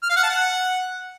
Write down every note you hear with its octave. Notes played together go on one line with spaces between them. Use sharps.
F6
F5
F#5
A5
F#5